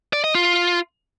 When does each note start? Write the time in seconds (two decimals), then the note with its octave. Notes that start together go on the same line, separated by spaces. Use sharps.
0.13 D5
0.24 D#5
0.35 F4